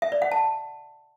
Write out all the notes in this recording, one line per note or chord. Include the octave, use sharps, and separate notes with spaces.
E5
D5
F#5
A5